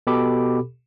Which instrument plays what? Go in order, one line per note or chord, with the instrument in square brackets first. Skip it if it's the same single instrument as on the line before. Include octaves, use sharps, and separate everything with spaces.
[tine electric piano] B2 G4 A4 B5 D6